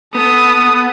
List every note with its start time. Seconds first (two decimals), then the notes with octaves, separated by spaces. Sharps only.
0.15 B3 A4 D#6